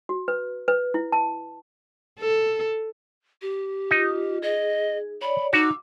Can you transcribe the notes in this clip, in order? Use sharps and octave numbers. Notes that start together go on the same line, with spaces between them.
F#4
B4
B4
E4
A5
A4
G4
D#4 F4
G#4 D#5
C#5 D5 B5
D#4 F#4 D6 E6